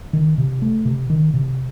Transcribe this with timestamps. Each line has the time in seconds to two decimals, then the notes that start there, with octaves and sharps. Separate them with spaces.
0.13 D#3
0.38 C3
0.62 A3
0.85 C3
1.10 D#3
1.34 C3